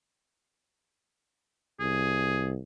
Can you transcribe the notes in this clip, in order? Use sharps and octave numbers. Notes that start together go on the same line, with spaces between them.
C2 G#4